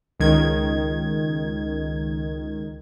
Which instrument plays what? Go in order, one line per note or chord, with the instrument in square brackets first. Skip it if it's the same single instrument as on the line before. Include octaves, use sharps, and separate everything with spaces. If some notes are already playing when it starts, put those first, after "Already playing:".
[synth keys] C#2 D#3 G#6